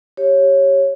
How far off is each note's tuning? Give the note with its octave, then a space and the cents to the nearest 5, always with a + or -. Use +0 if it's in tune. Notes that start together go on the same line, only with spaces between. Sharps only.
G4 +0 C#5 -10